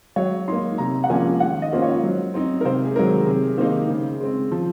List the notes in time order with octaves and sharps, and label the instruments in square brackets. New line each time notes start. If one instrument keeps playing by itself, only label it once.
[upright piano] F#3 C#5
A#3 D#4 C6
C3 A#5
F#5
F3 A#3 C#4 G#5
D#3 F#5
D#5
A#3 C#4 F4 C5
C#5
F#3
C4 D#4
A#4
C3 C5
G#4
D#3 F#3 A#4
C3 G#4
D#3 A#3 D#4 C5
C#3
G#3 C4
F3